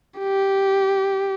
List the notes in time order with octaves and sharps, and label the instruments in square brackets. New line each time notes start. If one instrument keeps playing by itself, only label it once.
[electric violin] G4